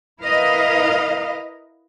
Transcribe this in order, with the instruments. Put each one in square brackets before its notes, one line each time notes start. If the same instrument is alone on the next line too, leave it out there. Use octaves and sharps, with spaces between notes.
[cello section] E4 A#4 B4 D#5 F5